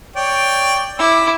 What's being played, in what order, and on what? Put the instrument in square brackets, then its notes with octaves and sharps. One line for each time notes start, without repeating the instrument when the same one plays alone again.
[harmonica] C#5 D5 G5
[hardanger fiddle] E4 D6 [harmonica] E6